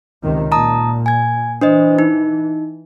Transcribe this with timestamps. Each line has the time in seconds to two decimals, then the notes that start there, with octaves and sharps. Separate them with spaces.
0.23 C#2 C3 D#3
0.52 A#2 A5 A#5 D#6
1.06 G#5 G#6
1.61 E3 D4 C5 D#5
1.99 D#4